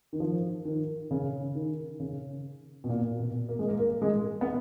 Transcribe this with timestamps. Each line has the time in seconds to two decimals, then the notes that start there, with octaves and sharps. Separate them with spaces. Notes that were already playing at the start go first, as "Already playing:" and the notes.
0.13 D#3
0.20 F3
0.65 D#3
1.11 C#3
1.55 D#3
2.00 C#3
2.84 B2
2.89 A#2
3.20 B2
3.49 A#3
3.59 G#3
3.69 A#3
3.79 A#3
4.02 G#3
4.41 B3